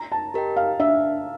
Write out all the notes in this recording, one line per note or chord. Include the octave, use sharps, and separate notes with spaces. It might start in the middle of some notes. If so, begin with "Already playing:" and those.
Already playing: A#5
A5
G4 A#4 D#5 G5
F5
D4 E5